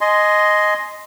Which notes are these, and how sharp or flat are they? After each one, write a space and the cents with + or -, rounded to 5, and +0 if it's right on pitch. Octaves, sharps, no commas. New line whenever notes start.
D#5 +0 G#5 +15 C6 -5